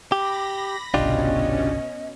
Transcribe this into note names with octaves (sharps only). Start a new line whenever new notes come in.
G4 B5 D6 A#6
G1 C2 B2 C#4 D4 F4 G4 D#5